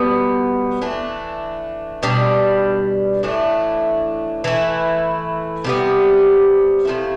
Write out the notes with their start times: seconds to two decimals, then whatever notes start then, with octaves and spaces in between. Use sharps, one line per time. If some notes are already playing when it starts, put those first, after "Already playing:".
Already playing: B2 G3 B3
0.81 E3 A3 D4
2.03 B2 G3 D4
3.23 A2 E3 A3 D4
4.44 E3 A3 E4
5.64 C3 G3 B3
6.85 C3 F3 A3 E4